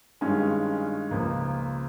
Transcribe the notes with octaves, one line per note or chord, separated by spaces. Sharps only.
G2 D#3 G#3 C#4 F4
C#2 C#3 F3 A#3